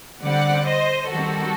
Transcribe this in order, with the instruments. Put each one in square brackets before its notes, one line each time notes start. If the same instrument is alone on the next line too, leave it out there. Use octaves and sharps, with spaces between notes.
[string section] D3 G3 C4 D5 F#5
C5 D#5
D#3 G3 C4 F#4 A4